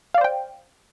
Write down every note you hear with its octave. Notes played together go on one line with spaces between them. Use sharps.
C5 D5 F5 G5